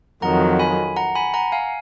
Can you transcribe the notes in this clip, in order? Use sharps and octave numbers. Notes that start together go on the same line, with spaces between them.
F2 D#3 F#3 F#5 A#5
G#5 B5
F#5 A#5
G#5 B5
F#5 A#5
F5 G#5